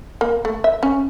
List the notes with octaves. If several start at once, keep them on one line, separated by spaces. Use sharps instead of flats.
A#3
A3
E5
C#4